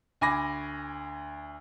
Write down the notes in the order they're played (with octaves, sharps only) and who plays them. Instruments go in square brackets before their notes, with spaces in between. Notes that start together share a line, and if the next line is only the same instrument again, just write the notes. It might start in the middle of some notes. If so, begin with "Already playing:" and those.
[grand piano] D2 G#5 B5 D6 A#6